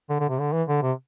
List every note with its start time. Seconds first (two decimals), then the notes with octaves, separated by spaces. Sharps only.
0.09 D3
0.20 D3
0.29 C3
0.39 D3
0.53 E3
0.68 D3
0.82 C3